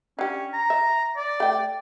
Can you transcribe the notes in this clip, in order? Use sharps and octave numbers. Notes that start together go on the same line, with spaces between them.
C#4 D4 G4
A#5
E5
D5
A3 G5